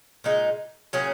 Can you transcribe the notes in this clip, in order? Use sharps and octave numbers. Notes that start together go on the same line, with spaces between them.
A#2 G#3 D#4
A#2 F#3 C#4 G#4